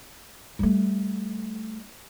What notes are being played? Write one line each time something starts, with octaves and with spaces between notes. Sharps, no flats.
G3 A3